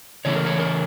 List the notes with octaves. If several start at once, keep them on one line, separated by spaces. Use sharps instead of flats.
C#3 E3 A3 C#4 E4 C#5
A#4
C#5
A#4